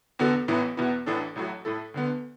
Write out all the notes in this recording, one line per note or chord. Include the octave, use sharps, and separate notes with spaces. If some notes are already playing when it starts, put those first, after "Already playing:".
E2 D3 B3 F#4 A4
A1 A2 E3 B3 E4
E2 B2 B3 E4
A1 A2 E3 D4 A4
A1 A2 F#3 A3 F#4
A2 A3 E4 A4
D2 D3 B3